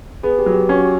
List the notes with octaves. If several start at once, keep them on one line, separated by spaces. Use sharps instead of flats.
B3 G#4
G4
F#3
G4
C#4 F#4